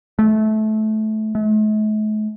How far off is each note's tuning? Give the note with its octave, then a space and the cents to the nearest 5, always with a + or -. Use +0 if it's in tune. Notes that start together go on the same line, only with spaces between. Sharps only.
A3 -20
A3 -45